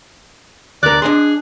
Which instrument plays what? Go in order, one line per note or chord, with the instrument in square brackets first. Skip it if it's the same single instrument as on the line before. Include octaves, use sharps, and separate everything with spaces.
[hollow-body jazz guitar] D2 A#4 [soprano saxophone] D5 [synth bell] F#6
[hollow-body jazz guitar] D4 D#5 C6 [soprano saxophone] G#4